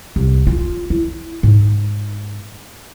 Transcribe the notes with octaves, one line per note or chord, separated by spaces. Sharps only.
C2
F4
E4
G#2